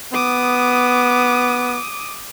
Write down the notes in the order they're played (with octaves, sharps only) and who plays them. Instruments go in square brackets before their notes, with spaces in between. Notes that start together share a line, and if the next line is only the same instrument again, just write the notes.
[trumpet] B3 [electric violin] D6 D#6